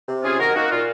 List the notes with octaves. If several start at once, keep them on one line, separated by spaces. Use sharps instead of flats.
C3
C#4 F4 G#4
D#3 F#4 A#4
A#3 D#4 F#4
A#2 F4